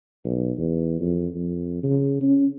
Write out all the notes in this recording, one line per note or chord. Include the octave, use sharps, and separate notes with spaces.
B1
E2
F2
F2
C#3
C#4